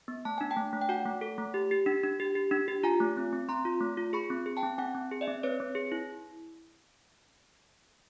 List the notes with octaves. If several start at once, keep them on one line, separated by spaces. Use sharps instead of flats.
B3
A3 A5
D4 G#5
G5 A5
A3
A3
G5
F#4 F#5 G#5
A3
A4
A3
G4
G4
D4
D4
G4
G4
D4
G4
F4 G#5 A#5
A3
C4
C4
C4 A#5 C6
F4
A3
F4
G#4 B5 C#6
C4
G#4
G5 A5
C4
C4 F#5 G#5
C4
G#4
D5 E5
C4
C4 B4 C#5
C4
G#4
E4